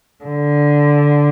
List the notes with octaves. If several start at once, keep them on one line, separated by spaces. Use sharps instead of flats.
D3